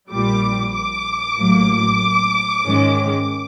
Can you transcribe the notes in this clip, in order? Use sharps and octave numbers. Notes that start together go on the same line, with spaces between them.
A#1 A#2 G3 D6
D6
A1 A2 F#3 A#3
G#2 D#3 G#3 C#4